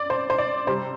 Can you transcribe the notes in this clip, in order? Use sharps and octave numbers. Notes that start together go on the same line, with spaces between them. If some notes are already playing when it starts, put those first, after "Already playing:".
Already playing: D5
C5
C5
D5
C3 G3 C5